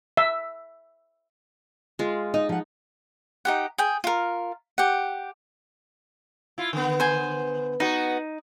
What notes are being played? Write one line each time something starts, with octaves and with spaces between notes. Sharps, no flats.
E5
G#3 F4
D#4 D#5
F3 F#5
D#4 G4 F#5
G#4 G5
F4 A#4
G4 F#5
E4 F4
D3 B3
C5 G#5
B3 D#4 F#4